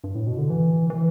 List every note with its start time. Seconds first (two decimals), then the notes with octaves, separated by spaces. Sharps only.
0.04 G2
0.15 A2
0.27 B2
0.38 D3
0.50 E3
0.90 E3